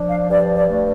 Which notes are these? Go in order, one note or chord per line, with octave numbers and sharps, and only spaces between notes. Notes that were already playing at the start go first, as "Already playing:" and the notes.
Already playing: F3 D4
F5
G2 D5
D5
A3